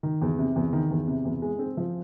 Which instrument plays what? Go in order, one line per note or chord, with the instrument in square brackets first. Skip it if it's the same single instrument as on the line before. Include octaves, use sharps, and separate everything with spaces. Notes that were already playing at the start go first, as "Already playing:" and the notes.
[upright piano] D#3
E2
C3
E2
D#3
E2
C3
E2
G#3
C4
F3